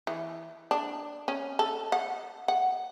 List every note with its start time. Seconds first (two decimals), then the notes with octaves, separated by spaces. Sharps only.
0.07 E3
0.71 D4
1.28 C#4
1.59 A4
1.92 F#5
2.48 F#5